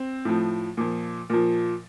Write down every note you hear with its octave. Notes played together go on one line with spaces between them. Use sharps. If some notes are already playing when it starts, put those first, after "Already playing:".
Already playing: C4
A2 F3
A#2 F3
A#2 F3